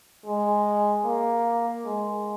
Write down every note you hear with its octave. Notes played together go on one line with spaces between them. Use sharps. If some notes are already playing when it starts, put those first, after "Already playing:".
G#3
A#3
G#3